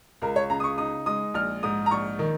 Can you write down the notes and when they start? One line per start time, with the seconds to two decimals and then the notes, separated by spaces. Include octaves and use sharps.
0.22 C#2 A#4
0.36 C#5
0.50 C#3 A#5
0.60 D#6
0.64 C#6
0.78 D#4 D#6
1.06 G#3 D#6
1.34 A#1 F6
1.63 G#2 D#6
1.86 A#5
1.91 A#1 C#6
2.19 D#3